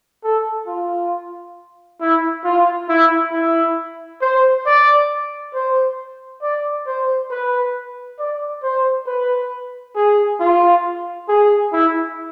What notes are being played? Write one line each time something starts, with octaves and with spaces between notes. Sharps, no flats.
A4
F4
E4
F4
E4
E4
C5
D5
C5
D5
C5
B4
D5
C5
B4
G#4
F4
G#4
E4